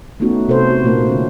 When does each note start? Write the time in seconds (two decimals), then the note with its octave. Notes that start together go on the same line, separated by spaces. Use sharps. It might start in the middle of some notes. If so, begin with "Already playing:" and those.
0.20 A3 B3 C#4 D#4 F#4
0.48 C3 A4 B4 C5
0.70 F#4
0.83 A#2 A3 A#3 D#4 C5
1.09 D3 C#4